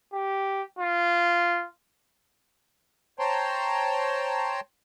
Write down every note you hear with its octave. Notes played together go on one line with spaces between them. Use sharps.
G4
F4
C5 C#5 G5 A5 A#5 C6